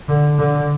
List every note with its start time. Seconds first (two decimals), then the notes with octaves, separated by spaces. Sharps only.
0.09 D3
0.39 D3